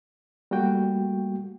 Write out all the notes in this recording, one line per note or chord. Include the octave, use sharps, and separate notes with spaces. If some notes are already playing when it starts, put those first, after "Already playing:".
G3 A3 A#3 F#4 G5